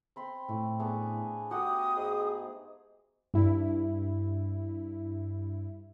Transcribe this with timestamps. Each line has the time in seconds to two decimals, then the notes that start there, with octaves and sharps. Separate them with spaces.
0.16 C4 B5 C6
0.49 A2 A3
0.79 A3 B3 D4 G#4
1.51 A3 F#4 G4 F#5 D#6
1.96 G#2 G#4
3.34 G2 E4